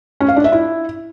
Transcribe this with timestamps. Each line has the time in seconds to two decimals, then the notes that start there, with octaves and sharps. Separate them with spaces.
0.20 C#4
0.28 F5
0.36 D4
0.44 E5
0.52 E4